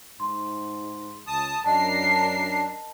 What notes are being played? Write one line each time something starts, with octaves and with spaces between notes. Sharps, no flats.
G#2 C6
C#2 A5 D#6
F#2 D4 A#4 D#5 A5 C7